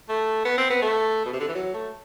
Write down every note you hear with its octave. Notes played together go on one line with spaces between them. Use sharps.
A3
B3
C4
B3
A3
B2
C3
D3
E3
F#3
A3